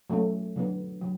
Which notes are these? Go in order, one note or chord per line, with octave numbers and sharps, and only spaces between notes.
F#3 A3 C#4
D3 F#3 B3
D3 F#3